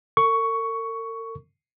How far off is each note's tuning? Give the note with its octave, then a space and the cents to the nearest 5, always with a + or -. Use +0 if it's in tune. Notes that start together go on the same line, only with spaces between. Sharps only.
A#4 -45 C#6 +10